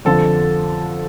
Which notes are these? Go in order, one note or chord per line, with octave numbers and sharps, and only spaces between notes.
F2 D3 F3 A4